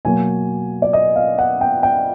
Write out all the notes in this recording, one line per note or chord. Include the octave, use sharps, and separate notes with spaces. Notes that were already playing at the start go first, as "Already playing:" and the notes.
B2 F#3 A#3 G#5
D5
D#5
F5
F#5
G5
G5